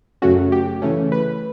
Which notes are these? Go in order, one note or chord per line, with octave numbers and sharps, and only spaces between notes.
F#2 C#3 F#3 A3 C#4 F#4
G4
C#3 E3 A3 C#4
B4